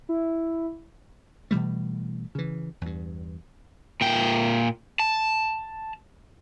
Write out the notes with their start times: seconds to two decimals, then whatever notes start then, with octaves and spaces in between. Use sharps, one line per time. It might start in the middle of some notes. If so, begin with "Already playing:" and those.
0.09 E4
1.51 B2 E3 G3 A3
2.35 C#3 E3
2.81 E2 G2
4.01 A#2 G5
4.99 A5